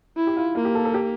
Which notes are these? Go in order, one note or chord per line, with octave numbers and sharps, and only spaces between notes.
E4
G4
F4
A#3 F4
G4
A4
A4
G4